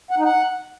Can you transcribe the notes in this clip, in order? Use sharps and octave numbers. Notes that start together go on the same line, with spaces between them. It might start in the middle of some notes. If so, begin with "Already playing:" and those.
F#5
D#4
F#5